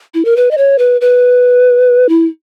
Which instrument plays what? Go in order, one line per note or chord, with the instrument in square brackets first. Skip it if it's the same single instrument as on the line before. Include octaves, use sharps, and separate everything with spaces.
[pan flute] E4
A#4
B4
D#5
C#5
B4
B4
E4